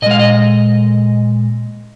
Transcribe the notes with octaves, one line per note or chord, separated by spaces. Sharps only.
A#2 G#3 D#5 F5
D#5